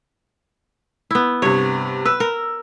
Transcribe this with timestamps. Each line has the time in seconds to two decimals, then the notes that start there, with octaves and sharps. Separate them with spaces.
1.11 B3 E4
1.42 G2 C3 C#5
2.05 B4 E6
2.20 A#4